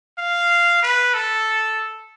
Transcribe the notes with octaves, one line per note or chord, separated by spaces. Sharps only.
F5
B4
A4